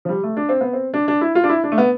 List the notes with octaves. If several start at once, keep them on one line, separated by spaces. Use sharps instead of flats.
F3
G3
A3
D4
C4
B3
C4
D4
D4
E4
F4
D4
E4
D4
A3
B3